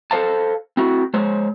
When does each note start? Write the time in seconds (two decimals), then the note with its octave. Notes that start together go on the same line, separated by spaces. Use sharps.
0.11 A4 C5 F5 A5
0.77 C4 E4 F#4
1.14 G#3 C5 C#5